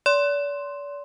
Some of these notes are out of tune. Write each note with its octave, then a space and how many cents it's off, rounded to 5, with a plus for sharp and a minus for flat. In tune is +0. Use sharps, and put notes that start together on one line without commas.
D5 -40 C6 +0